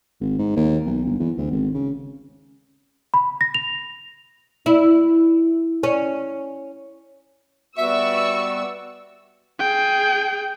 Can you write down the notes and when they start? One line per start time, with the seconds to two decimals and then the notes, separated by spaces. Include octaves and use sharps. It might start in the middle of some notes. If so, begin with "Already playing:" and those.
0.21 G#1
0.38 G#2
0.56 D#2
0.86 B1
1.05 G1
1.20 E2
1.37 D2
1.51 G#1
1.74 C#3
3.14 B5
3.41 A#6
3.55 F7
4.66 E4
5.83 C#4
7.78 G3 B3 F#4 D5 E5 C#6 E6
9.60 G#4 G5